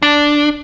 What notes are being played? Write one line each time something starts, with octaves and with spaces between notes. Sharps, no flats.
D4